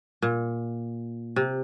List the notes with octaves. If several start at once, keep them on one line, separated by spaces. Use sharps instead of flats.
A#2
C3